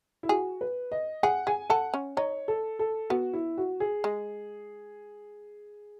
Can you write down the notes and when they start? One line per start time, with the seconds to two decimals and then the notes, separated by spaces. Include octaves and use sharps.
0.23 E4
0.29 F#4 G#4
0.61 B4
0.92 D#5
1.23 G#4 F#5
1.47 G#4 G#5
1.70 A4 F#5
1.94 C#4
2.17 D#4 C#5
2.48 A4
2.79 A4
3.10 B3 F#4
3.33 E4
3.58 F#4
3.80 G#4
4.04 G#3